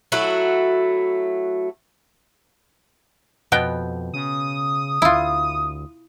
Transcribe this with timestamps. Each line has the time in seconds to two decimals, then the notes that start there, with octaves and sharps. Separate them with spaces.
0.12 F#3 A3 E4 F#4
3.52 F2 B2 B3 G5
4.14 C#3 D#6
5.02 D2 E4 F4